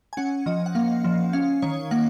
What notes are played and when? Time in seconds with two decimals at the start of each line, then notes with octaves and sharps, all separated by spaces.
0.13 G#5
0.17 C#4 F#5
0.46 F3 D#5
0.66 F#5
0.75 A#3 F5
1.04 F3
1.33 C#4 F5
1.62 D#3 C#5
1.91 A#3 F#5